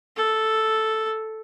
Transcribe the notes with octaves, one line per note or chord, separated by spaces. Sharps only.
A4